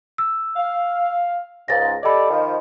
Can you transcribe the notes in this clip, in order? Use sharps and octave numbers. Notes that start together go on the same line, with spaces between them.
E6
F5
C#2 G#2 F5 A6 A#6
G4 A4 D5 D#5 B5
D#3 F3